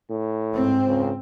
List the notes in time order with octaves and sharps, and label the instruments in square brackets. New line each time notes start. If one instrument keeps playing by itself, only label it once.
[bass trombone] A2
[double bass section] G#2 C4
[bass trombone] C#2